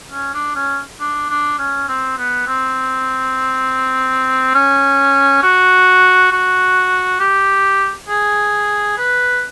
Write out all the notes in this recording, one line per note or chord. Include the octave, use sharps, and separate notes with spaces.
C#4
D4
C#4
D4
D4
C#4
C4
B3
C4
C#4
F#4
F#4
G4
G#4
B4